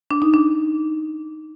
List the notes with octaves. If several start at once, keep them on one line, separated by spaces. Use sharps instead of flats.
D4
D#4
D4